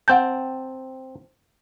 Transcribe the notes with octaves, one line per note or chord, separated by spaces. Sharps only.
C4 F#5 G5 A5 G6